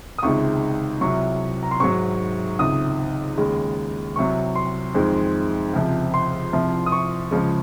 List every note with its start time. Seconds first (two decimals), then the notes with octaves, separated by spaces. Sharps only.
0.18 D#6
0.22 C#2 C3 D#3 G#3 C#6
1.01 C2 C3 F#3 C#6
1.63 A#5
1.71 C6
1.80 G#2 D#3 F#3 C#6
2.59 C#2 C3 D#3 D#6
3.38 D#2 C#3 G#3
4.16 C2 C3 F#3 C#6
4.56 C6
4.95 F2 D#3 G#3
5.73 C#2 C3 F3
6.14 C6
6.53 C2 C3 F3
6.86 D#6
6.92 C#6
7.31 C#2 C#3 F3 G#3